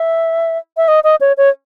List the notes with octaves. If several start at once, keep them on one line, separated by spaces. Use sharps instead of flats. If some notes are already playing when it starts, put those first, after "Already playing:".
Already playing: E5
E5
D#5
D#5
C#5
C#5